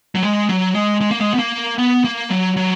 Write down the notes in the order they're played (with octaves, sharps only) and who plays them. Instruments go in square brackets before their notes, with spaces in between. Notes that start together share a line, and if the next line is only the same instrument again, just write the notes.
[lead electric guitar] F#3
G#3
F#3
G#3
G#3
A#3
G#3
B3
A#3
B3
A#3
F#3
F#3